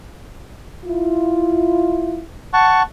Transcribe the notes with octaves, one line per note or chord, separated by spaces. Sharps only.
E4 F4
F#5 A5 C#6